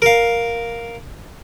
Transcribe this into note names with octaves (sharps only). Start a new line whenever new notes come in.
A#4 F5